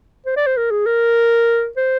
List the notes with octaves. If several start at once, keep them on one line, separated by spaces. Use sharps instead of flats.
C5
D5
C5
A#4
G#4
A#4
C5